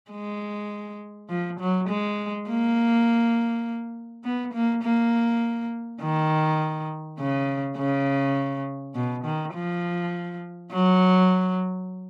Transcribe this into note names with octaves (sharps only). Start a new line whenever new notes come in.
G#3
F3
F#3
G#3
A#3
B3
A#3
A#3
D#3
C#3
C#3
B2
D#3
F3
F#3